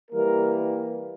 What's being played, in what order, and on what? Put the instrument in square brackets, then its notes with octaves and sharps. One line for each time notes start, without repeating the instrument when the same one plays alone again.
[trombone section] E3 G3 A#3 A#4